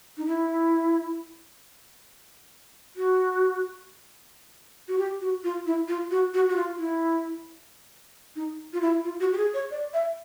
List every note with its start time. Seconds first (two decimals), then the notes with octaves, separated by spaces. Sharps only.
0.18 D#4
0.26 E4
2.96 F#4
4.88 F#4
4.98 G4
5.21 F#4
5.44 F4
5.66 E4
5.88 F4
6.11 F#4
6.34 F#4
6.49 F#4
6.56 F4
6.78 E4
8.36 D#4
8.73 F4
8.81 E4
9.04 F4
9.20 F#4
9.33 G4
9.37 G#4
9.54 C#5
9.71 D5
9.94 E5